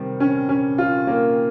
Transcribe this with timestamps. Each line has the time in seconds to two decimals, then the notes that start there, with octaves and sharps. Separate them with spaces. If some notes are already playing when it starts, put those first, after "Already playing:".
Already playing: C3 D#3 G3
0.20 C#4
0.49 C#4
0.78 F4
1.07 A#3